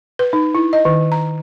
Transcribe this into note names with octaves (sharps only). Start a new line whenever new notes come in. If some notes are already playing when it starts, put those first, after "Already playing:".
B4
D#4
E4
D#5
D#3
A#5